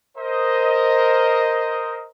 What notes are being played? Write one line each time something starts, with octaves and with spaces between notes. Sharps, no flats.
A#4 C5 D#5